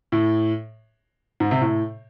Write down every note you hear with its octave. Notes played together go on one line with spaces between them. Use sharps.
A2
G#2
C3
A2